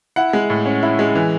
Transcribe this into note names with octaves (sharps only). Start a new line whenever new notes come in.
E4 F#5
G#3
A2
C#4
E4
G#3
E3